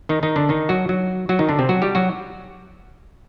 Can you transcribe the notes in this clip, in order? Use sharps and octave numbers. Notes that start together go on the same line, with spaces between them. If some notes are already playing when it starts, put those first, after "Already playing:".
D#3 D#4
D#3 D#4
D3 D4
D#3 D#4
F#3 F#4
F#3 F#4
F#3 F#4
D#3 D#4
D3 D4
C3 C4
F#3 F#4
G3 G4
F#3 F#4